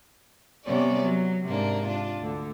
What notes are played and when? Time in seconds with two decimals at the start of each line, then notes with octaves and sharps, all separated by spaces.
0.65 C3 G3 B3 C#4 D5
1.04 F#3
1.45 G#2 C3 A#3 D4
1.85 D4 F4
2.20 D2 D3